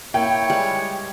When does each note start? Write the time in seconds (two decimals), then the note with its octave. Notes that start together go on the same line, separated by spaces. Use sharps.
0.14 A#3 E4 C#5 G5
0.50 G3 G#3 B4